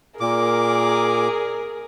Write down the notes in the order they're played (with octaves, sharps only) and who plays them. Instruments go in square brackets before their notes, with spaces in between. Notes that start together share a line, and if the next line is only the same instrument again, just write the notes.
[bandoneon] A#2 D6 [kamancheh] G#4 A#4